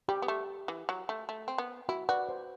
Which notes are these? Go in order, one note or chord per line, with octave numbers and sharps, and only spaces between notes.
G3 G4
B3
A3
E3
F#3
A3
A3
C4
B3
E4 F#4
F#4 B4 D5
C5